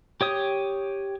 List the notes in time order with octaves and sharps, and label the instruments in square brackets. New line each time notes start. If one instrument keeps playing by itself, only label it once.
[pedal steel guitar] G4 C#5 D#6